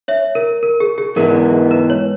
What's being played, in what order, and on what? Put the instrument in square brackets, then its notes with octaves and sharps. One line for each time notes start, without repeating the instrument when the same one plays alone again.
[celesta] C#5 E5
A#4
A#4
G#4
G#4
[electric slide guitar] G#2 E3 G#3 B3 [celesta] A#4
[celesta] B4
C#5